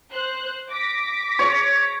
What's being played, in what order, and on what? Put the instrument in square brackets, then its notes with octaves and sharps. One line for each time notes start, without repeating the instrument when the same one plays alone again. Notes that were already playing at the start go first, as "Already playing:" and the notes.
[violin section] C5 F#6
D6 A#6 B6
[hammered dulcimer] C#5